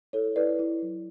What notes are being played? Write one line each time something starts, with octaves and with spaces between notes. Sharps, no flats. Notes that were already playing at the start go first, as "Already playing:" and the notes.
E4 A4 C#5
E4 B4 D5
E4
F#3